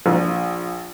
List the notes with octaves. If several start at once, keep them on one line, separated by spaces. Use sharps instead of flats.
A#1